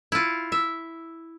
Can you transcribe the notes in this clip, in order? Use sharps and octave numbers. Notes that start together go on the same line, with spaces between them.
E4 F4
E5